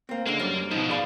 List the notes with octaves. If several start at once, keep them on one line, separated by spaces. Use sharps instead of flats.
A#3 C4
D3 G#3 A#3
F#2 G3
G#2 B2 F3 D#4 E4
G#4 D5 F5 B5